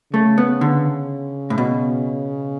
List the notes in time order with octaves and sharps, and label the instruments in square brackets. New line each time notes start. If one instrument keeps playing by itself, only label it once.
[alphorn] C#3 [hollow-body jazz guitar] A3
[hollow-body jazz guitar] B3
D3
A2
B2